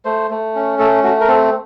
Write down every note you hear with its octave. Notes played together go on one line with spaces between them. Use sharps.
A3 C5
A3
C#4
A3 A4
A3 F#4
A#4
C4 A4